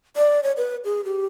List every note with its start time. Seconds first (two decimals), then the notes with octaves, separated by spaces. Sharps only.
0.17 D5
0.43 C#5
0.57 B4
0.85 G#4
1.05 G4